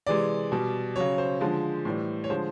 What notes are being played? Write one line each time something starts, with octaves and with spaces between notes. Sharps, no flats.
C3 E3 G#3 D5
B2 G3
C#3 F#3 C#5
C5
D3 F3 G#3
A2 E3 G3
C#5
D3 F3 G#3 C5